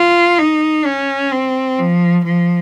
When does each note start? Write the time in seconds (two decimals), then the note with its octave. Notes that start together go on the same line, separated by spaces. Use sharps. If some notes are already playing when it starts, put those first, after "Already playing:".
Already playing: F4
0.39 D#4
0.86 C#4
1.32 C4
1.79 F3
2.25 F3